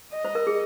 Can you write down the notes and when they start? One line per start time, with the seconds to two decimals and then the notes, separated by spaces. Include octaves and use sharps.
0.13 D#5
0.25 C5
0.35 A#4
0.47 G#4